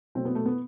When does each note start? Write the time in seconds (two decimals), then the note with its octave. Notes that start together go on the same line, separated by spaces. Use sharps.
0.15 B2 F#3 A3 C4
0.25 B3
0.35 A3
0.46 B3